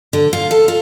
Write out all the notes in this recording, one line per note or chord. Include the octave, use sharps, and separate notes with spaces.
D3
F4
A4
F4